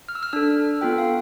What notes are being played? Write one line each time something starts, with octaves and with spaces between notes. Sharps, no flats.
F6
E6
F6
D4 A4 E6
B3 F4 A4 G5
F5